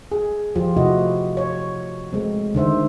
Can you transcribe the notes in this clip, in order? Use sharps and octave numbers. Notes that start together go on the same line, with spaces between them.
G#4
F3 F4 G4
C3 A3 E4 F#4 D#5
C#5
G#3 A3 C4
D3 D#3 C5 E5